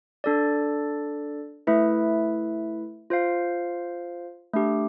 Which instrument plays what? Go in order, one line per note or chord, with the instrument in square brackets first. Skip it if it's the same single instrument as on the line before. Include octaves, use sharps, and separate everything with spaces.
[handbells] D4 A4 D5
A3 E4 B4 E5
F4 C5 F5
A3 D4 G4